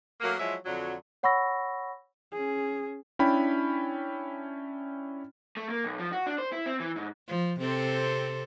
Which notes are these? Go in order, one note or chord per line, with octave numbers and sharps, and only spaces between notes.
F#3 A3 A#3
F3 F#3 G#3 E4 E5
F2 D3 F#3
C#5 F#5 B5 C#6 E6 A#6
C#4 G#4
C#4 D4 E4 G5 B5
A3
A#3
B1
F3
F#4
D4
C5
E4
C4
E3
G#2
F3
C3 C4 A4